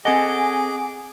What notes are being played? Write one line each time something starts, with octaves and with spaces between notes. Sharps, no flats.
C4 G#4 A4 D#5 F#5 G#5 D6